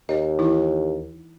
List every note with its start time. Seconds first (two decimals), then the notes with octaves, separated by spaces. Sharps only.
0.09 D#2 C#5 D#5
0.39 E3 D#4 E4